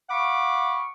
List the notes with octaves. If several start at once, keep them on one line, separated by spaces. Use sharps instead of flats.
F5 F#5 B5 C#6 D6